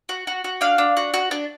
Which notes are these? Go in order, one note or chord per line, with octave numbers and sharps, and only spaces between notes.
F#4
F#4
F#4
D4 F5
D4
F#4
F#4
D4